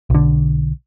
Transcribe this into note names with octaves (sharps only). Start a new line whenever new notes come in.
B1 D3